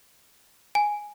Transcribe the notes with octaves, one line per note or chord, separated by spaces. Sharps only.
G#5